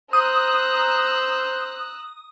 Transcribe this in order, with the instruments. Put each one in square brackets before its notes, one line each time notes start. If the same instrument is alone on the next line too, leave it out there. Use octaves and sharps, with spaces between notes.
[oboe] C5 [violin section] A#5 E6 F#6 [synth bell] D#6